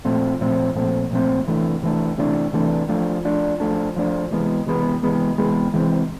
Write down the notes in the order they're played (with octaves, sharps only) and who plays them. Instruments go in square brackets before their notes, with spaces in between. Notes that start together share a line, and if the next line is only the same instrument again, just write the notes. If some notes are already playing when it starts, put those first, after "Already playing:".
[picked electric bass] A#2 F3 A3 C4
A#2 F3 A3 C4
A#2 F3 A3 C4
A#2 F3 A3 C4
C3 E3 A3 D4
C3 E3 A3 D4
C3 E3 A3 D4
C3 E3 A3 D4
F3 A3 D4
F3 A3 D4
F3 A3 D4
F3 A3 D4
C3 E3 G#3 B3
C3 E3 G#3 B3
C3 E3 G#3 B3
C3 E3 G#3 B3
C3 E3 G#3 C4